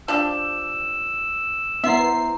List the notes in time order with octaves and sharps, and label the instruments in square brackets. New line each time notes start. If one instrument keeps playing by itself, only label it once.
[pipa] F3 D4 G4 [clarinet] E6
[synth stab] B3 C7 [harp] E4 C5 A#5 [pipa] E5